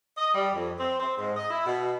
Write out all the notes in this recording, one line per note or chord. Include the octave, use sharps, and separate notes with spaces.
D#5
G3
F2
C4
C4
G#2
D#5
E4
B2